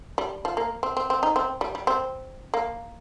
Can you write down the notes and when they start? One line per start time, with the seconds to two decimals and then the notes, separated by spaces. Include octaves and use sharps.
0.18 G3
0.45 F3
0.57 A#3
0.83 C4
0.97 C4
1.10 C4
1.23 D#4
1.36 C4
1.61 G3
1.75 G3
1.87 C4
2.54 A#3